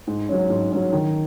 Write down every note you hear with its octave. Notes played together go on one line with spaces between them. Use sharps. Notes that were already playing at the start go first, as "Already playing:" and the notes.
G#2
F#3 C#4
G#2
F#3 C#4
D#3